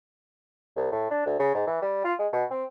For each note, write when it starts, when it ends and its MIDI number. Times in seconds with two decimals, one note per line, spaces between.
0.76 0.91 36
0.91 1.07 45
1.11 1.22 62
1.26 1.39 38
1.39 1.54 49
1.55 1.67 44
1.67 1.78 52
1.82 2.00 55
2.04 2.14 65
2.19 2.27 56
2.33 2.44 47
2.50 2.64 60